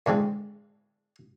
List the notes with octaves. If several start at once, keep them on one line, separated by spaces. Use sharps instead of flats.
A2 D3 G#3 C4